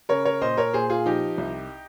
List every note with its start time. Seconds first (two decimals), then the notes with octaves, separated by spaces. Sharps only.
0.09 C#3 A#4 C#5
0.25 A#4 C#5
0.41 A#2 C5 D#5
0.57 A#4 C#5
0.73 A#2 G#4 C5
0.90 F4 G#4
1.06 F3 D#4 G4
1.38 C2